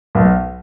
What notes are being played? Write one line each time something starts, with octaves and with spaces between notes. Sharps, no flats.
B1